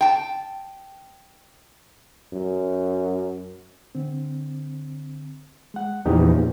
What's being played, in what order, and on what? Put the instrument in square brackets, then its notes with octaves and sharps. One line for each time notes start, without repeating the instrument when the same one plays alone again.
[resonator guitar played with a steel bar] G5 A5
[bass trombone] F#2
[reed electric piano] D3 C4
G#3 F#5
[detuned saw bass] E2 [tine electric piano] A#2 C#3 F3 [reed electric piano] A#3 D#4 G4